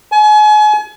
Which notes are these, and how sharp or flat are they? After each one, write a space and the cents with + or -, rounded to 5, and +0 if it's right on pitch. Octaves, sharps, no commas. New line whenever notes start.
G#5 +35